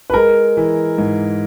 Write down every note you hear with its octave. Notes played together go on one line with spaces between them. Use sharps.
B4
G#3 A#4
E3
G#2